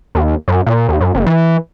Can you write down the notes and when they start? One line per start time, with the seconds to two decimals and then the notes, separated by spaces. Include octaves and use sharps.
0.15 D#2
0.48 F#2
0.67 A#2
0.89 D#2
1.00 F#2
1.15 F#1
1.26 E3